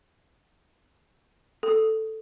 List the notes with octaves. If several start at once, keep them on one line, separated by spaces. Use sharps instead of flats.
A4